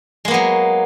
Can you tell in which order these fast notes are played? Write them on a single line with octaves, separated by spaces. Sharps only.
G#3 A#3 B3 F#3